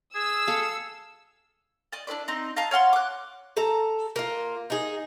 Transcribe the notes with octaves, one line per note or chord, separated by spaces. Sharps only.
G#4 E6
A4 F5
D5 D#5
D4 E4 B4 D5
C4 D#4
D#5 F5 A5 A#5
C#5 F5 F#5 C6
D6 F#6
A4 A5 A#5
A#3 F4
D#4 G#4